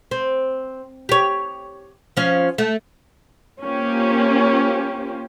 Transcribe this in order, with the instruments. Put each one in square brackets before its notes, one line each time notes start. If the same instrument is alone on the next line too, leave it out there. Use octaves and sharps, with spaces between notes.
[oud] C4
G4 C#5
F3 C#4
A3
[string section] A#3 C#4 F4 G4 C5